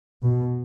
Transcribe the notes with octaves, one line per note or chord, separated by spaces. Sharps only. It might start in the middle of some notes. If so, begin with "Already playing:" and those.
B2